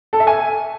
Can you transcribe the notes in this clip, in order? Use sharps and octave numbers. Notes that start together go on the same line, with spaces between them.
A4
E5
G#5